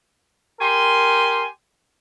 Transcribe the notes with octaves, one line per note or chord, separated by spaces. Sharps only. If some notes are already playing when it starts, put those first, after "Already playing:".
G4 A#4 G#5 C6